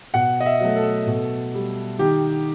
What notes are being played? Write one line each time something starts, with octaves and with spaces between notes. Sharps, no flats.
B2 F#5
D#5
E5
F#3 A3
A4
B2
G3
D#3 G4